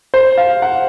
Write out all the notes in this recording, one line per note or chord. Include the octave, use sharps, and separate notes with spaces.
C5
F5
F#5